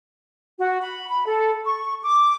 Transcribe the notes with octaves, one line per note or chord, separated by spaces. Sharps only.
F#4
B5
B5
A4
C#6
D6